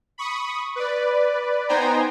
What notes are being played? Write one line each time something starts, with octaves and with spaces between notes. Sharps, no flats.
B5 C#6 D#6
B4 D5
B3 D#4 C5 G5 G#5 A#5